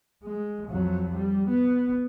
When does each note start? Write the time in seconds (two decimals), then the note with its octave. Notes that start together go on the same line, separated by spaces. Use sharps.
0.23 G#3
0.68 F2 F#3
1.15 G3
1.48 B3